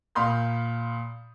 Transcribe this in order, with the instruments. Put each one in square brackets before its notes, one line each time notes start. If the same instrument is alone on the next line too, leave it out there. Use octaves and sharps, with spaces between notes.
[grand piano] A#2 F5 B5 C6 D#6 G6